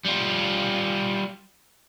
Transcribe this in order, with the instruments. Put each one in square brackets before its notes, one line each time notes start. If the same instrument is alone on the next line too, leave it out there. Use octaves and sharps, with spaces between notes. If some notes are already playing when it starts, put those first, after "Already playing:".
[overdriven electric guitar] G3 F4